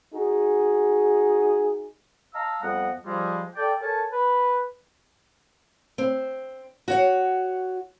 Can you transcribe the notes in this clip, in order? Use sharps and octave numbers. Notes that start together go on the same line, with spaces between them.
D#4 F#4 G#4
D#5 F5 A5 A#5 E6 F6
F2 G3 B3 D#5 F#5
F3 G3 G#3
A4 D5 G5
A4 A#4 C#5 G#5 A5
B4
C4
F#4 C#5 F#5